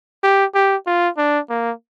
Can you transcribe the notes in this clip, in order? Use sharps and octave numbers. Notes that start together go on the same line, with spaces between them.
G4
G4
F4
D4
A#3